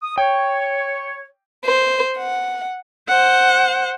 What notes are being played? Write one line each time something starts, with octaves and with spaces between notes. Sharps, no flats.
D#6
C#5 G5
C5
F#5
C5 F#5